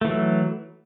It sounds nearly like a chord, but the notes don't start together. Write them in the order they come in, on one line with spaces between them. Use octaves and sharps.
A3 E3 F#3